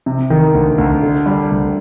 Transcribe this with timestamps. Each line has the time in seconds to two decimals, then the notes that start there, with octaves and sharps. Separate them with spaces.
0.06 C3
0.30 D#3
0.54 D2
0.78 D2
1.02 D3
1.26 G3
1.51 D2